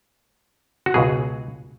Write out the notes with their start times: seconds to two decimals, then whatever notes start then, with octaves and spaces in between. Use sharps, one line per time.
0.86 F#4
0.94 C#2 B2 F#3 G#4